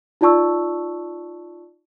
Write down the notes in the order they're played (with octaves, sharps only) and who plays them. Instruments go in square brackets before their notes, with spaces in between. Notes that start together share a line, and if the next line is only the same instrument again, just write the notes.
[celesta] D#4 F4 D5 A5 C#6 E6